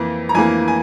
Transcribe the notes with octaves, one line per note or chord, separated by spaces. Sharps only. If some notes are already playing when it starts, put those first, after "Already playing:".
Already playing: F2 E3 A#3
A#5
F2 E3 A#3 G#5
G#5